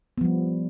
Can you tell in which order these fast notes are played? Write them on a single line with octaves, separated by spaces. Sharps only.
B3 F3 G3